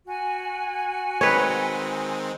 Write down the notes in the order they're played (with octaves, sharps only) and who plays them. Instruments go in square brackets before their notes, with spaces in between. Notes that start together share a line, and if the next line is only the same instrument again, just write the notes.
[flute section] F#4 G#5
[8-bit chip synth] D#3 G#3 C4 [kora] B4 C#5